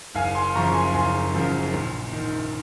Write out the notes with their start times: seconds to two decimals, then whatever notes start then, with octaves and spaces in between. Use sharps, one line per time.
0.15 F#1 F5 G#5
0.35 G#5 C6
0.54 F#2 C#3 F3 A#5 C#6
0.74 G#5 C6
0.93 F#1 G#5 C6
1.34 F#2 C#3 F3
1.73 A#1
2.12 G#2 D#3